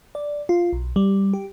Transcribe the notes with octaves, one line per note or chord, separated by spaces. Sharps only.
D5
F4
B1
G3
G4